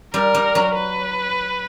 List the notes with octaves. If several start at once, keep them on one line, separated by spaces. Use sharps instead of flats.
G3 A#4
G3
F#3
B4